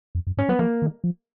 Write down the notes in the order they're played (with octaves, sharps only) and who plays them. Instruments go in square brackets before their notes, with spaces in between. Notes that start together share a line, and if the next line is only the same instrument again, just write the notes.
[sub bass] F2
F#2
[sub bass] G#2 [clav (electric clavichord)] C#4
[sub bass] F#3 [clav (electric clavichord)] B3
[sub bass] F3 [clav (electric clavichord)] A#3
[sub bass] D#3
F3